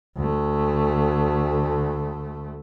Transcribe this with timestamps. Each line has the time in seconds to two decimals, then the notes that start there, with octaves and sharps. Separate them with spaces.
0.16 D2 A3